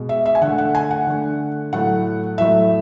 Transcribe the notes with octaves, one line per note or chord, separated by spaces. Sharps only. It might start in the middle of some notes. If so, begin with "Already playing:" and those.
Already playing: B2 G#3
E5
E5
G#5
D3 F#5
A3
F#5
G#5
F#5
D3 A3
A2 F#3 A3 F#5
A2 F#3 A3 E5